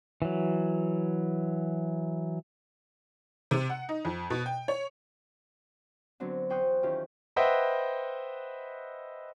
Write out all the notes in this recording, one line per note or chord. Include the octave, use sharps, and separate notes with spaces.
E3 F#3
C3
F#5
D#4
F2
B2
G5
C#5
D3 F#3 B3 C4 D4
E2 C5 G5 C#6 D#6 F#6
D#3 E3 C#4 F4 G4
B4 C5 D#5 E5 F#5 G5